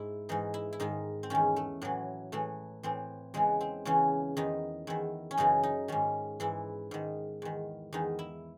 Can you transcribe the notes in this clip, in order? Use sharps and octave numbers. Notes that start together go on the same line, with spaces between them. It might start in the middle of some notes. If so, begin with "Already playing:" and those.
Already playing: G#2 E4
G#2 E3 D#4
E4
E4
G#2 D#3 D#4
C4
E2 D#3 C#4
A3
A2 E3 F#3
A2 E3 A3
A2 E3 C4
E2 C#3 E3 G#3
C4
E2 C#3 E3 C#4
E2 D#3 D#4
E2 D#3 E4
C#4
F#2 C#3 E3 D#4
D#4
G#2 D#3 C#4
G#2 E3 E4
G#2 D#3
E2 D#3
E2 D#3 D#4
E4